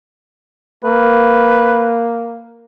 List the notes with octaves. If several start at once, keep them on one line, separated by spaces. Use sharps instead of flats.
A#3 B4